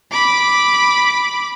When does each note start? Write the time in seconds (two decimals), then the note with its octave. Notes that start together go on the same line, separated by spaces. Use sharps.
0.11 B5 D6